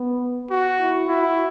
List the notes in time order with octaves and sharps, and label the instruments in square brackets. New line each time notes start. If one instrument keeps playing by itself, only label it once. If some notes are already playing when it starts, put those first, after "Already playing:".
Already playing: [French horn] B3
[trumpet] F#4
[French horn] E4
[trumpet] E4 [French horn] F#4